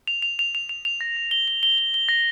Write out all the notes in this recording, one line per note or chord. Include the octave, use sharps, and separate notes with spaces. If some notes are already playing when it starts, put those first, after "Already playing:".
F7
F7
F7
F7
F7
F7
A#6
A#6
G7
G7
G7
G7
G7
A#6